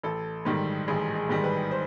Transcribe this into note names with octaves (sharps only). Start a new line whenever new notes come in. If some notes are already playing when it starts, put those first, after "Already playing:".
A1 A4
G#2 D#3 G3
A1 G#4
G#4
G#2 D#3 G3
B4
C5